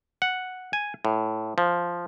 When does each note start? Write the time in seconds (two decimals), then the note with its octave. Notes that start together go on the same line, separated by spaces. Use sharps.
0.22 F#5
0.73 G#5
1.05 A2
1.58 F3